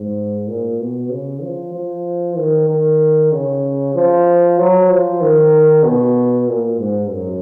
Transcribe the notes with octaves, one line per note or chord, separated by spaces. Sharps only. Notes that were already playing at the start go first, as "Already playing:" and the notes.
Already playing: G#2
A#2
B2
C#3
F3
F3
D#3
D#3
C#3
F3
F#3
F3
D#3
B2
A#2
G#2
F#2